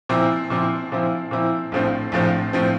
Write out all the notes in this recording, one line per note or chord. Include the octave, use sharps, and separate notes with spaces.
A#2 F3 C4 E4
A#2 F3 C4 E4
A#2 F3 C4 E4
A#2 F3 C4 E4
A#1 A2 F3 C4
A#1 A2 F3 C4
A2 F3 C4